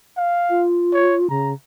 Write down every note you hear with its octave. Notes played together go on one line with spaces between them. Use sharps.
F5
F4
C#5
C#3 A#5